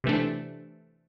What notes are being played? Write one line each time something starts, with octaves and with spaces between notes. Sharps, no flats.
C3 E3 A3 D4